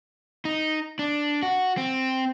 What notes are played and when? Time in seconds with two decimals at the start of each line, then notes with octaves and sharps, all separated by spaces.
0.45 D#4
0.99 D4
1.43 F#4
1.77 C4